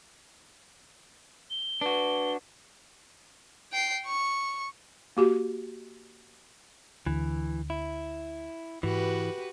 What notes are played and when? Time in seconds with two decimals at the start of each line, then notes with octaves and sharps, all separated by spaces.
1.50 G7
1.81 D4 F#4 B4
3.72 G5 C7
4.06 C#6
5.17 A#3 F#4 G4
7.07 D2 D3 E3 G#3
7.70 E4
8.83 G#2 E3 F#4 G4 B4